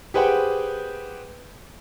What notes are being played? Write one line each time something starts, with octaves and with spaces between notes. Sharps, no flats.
G4 G#4 B4 C5 F#5 G5